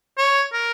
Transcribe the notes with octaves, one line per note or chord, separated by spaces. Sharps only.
C#5
A#4